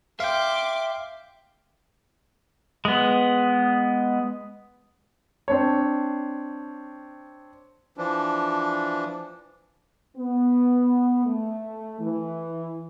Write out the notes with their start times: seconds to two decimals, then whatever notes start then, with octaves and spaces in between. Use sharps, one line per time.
0.20 E5 F5 G5 C6 D6
2.85 G#3 B3
5.48 C4 D4 C#5
7.97 E3 F3 D4
10.16 B3
11.25 A3
12.00 E3